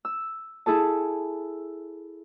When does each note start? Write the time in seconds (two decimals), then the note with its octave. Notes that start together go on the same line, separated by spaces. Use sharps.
0.05 E6
0.66 E4 G#4 A4 A5